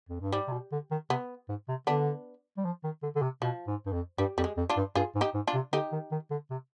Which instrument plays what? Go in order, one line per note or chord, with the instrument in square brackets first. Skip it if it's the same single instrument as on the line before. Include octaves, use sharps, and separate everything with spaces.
[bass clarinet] F2
G2
[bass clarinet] G#2 [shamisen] G3
[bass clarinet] C3
B2
D3
D#3
[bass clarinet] C3 [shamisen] B3
[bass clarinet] G#2
C3
[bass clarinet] D3 [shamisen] B3 D4
[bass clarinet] G3
F3
D#3
D3
D3
C3
[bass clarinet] B2 [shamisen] F3
[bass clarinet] G#2
G2
F2
[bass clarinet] G2 [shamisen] G3
[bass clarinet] F2 [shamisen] G3
[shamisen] G#3
[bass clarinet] F2
[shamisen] D4 F4
[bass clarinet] G2
[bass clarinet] G2 [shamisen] F4 G#4
[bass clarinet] G#2
[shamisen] D#4 G4
[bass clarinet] G#2
[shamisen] D4 F4
[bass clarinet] C3
[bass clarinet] D3 [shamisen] D#4 G4
[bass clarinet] D#3
D#3
D3
C3